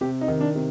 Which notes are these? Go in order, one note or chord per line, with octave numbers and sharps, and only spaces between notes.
C3 G4
D#4
D#3
D4
C3